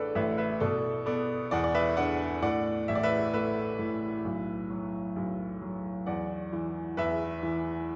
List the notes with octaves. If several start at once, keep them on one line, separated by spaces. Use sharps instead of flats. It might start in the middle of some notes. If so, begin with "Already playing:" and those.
Already playing: A1 A3 D4 A4 B4 D5
A1 B4 E5
B4 E5
B2 A4 D5
B3 A4 D5
E2 D5 F#5
D5
B4 E5
D4 D5 F#5
A2 D5 F#5
A1 E5
D5
B4 E5
A3 B4 E5
A2
B1
F#3
B1
F#3
E2 D5 F#5
E3
E2 B4 E5
E3